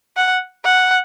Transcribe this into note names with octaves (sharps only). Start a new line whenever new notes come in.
F#5
F#5